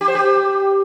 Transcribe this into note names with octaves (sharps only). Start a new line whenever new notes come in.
G4
C5
G4